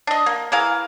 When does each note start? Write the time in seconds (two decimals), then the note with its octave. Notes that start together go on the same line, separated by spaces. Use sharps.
0.07 D4 D#5
0.26 A#3
0.52 E3 G#4 A#4 F5